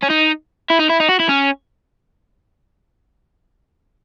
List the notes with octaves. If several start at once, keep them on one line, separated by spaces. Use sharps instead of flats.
C#4
D#4
E4
D#4
E4
D#4
F#4
E4
C#4